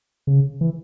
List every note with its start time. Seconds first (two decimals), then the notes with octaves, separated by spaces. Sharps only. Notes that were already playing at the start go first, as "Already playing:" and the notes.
0.27 C#3
0.61 E3